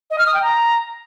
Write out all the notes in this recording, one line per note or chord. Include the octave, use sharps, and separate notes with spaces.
D#5
F6
D#6
G5
A#5